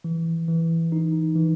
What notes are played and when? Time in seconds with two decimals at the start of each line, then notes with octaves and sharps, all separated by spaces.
0.04 E3
0.48 E3
0.92 D#4
1.35 E3